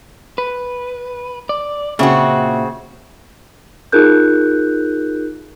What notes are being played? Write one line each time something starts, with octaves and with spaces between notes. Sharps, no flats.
B4
D5
A#2 C#3 C4 F#4 E5
D#4 F4 G#4 A#4 F#6 G6